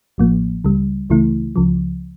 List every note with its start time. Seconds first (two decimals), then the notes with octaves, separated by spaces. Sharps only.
0.18 A1 A2 F3 A#3
0.64 C#2 C#3 G3
1.10 C#2 C#3 E3 A3 E4
1.56 C#2 C#3 F3